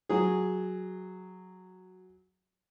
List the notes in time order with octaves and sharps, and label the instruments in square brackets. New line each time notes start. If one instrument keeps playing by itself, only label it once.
[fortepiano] F#3 G#4